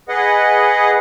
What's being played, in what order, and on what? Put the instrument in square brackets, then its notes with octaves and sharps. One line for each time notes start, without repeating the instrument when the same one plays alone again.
[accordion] G#4 B4 D#5 F#5